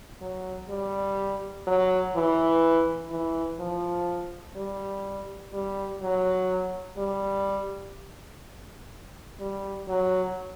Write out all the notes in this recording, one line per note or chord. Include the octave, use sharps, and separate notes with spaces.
F#3
G3
F#3
E3
E3
F3
G3
G3
F#3
G3
G3
F#3